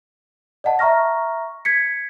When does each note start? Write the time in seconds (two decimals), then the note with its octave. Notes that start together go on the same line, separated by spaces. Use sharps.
0.64 D5 D#5 F#5 A5
0.79 E5 A#5 C#6 F6 A#6
1.65 G#6 B6 C#7